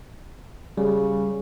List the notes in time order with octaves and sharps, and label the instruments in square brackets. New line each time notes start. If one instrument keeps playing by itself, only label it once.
[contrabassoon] C#3 [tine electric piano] G3